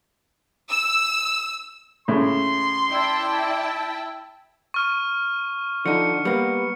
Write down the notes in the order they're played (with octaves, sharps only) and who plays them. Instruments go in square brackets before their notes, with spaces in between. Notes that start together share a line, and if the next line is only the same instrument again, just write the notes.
[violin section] E6
[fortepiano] A2 C#3 [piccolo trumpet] C6
[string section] E4 G5 A5 [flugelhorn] D5
[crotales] C#6 F6 D#7
[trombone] D3 [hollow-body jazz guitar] F3 D#4 [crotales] C#7
[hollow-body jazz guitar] G3 A#3 [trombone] B3